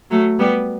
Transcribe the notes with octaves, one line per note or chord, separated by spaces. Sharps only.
F#3 A3
G3 B3